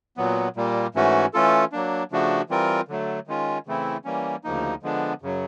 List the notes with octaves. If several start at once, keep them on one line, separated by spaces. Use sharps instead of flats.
A#2 F#3 B3
A#2 G3 A#3
G#2 E3 A3 C#4 F#4
E3 A3 C#4 F4 A4
F#3 A#3 D4
C#3 F3 A3 D4 F#4
E3 G3 C4 F4 A#4
D3 F#3 A3
D#3 G#3 C#4 F4
C#3 E3 A3 C4 E4
E3 G3 A#3 C#4
D2 C#3 F3 A#3 D#4
D3 F3 G#3 B3 D4
F#2 C#3 F#3